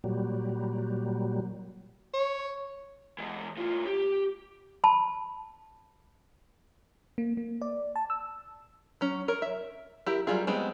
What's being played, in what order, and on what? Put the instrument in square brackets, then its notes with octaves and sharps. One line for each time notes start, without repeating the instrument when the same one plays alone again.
[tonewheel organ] A#2 F#3 G3
[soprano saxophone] C#5
[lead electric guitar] E3 G#3
A2 F4
G4
[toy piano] A5 B5
[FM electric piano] A#3
A#3
D5
A5
E6
[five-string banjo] F#3 C#4
A#4 C#5
E5
E4 G4 A#4
F#3 G3 A3 F4 G#4
G3 G#3 B3 C4